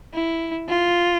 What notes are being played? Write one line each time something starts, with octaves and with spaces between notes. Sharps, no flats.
E4
F4